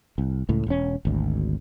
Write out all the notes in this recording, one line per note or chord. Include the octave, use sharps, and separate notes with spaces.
C2
C#2 A2
E1 C#4
G#1 D2